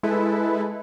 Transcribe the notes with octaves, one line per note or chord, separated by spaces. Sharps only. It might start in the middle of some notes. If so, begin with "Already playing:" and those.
G#3 E4 A4 B4